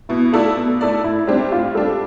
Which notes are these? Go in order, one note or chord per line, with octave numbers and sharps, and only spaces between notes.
B2 E4
A3 E4 F4 A4 D5
B2
A3 E4 A4 D5
A2 E4
G3 C4 D4 G4
A2 F4
G3 D4 G4 A4